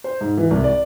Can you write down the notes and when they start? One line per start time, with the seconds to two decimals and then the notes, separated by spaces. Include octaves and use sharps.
0.04 C5
0.21 G#2
0.37 E3
0.51 C2
0.64 D5